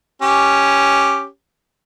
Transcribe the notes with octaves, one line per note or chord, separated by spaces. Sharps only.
C#4 G4